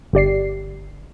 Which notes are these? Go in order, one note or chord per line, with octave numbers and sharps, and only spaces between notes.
G1 G4 D5 C7